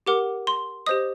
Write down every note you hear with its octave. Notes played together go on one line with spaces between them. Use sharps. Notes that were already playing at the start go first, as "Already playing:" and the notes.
G4 A#4 F#5 D6
C6
G4 C5 D#5 D#6